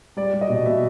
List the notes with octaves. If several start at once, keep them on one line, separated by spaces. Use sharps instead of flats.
G3 D5
G3
D#5
B2
B2 E5